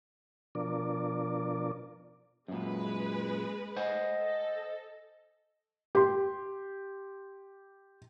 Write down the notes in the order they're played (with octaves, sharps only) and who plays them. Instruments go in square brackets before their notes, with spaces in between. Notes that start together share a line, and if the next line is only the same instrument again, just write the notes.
[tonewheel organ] B2 F3 D4 A#4 D5
[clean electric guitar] F#2 A#2 [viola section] G#3 B4
[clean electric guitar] C5 F#5 G#5 [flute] D#5
[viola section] A4
[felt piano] G4 C6